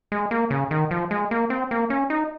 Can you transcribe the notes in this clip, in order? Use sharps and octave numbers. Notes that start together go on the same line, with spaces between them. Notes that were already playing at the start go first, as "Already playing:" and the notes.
G#3
A#3
C#3
D#3
F3
G#3
A#3
C4
A#3
C#4
D#4